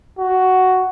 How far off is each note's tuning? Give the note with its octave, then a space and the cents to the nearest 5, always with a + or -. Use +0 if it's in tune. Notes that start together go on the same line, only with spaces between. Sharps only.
F#4 +5